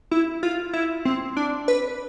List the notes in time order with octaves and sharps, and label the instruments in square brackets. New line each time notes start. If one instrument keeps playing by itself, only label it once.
[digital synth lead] E4
F4
E4
C4
D4
B4